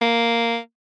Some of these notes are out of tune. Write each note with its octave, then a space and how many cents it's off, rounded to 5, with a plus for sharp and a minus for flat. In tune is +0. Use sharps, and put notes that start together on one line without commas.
A#3 -5